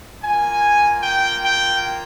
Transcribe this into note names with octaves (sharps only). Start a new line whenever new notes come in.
A#3 F4 G#5
G5
G5